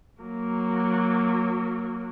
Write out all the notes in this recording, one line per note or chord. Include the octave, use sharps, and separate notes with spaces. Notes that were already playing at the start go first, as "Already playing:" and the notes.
F#3 A#3